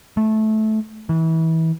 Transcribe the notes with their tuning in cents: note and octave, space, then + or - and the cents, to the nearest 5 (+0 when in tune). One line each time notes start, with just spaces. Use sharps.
A3 -15
E3 -30